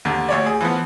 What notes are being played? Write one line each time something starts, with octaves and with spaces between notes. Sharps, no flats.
D#2 D3
D2 C#5 D5
G#4
E3 F3 B3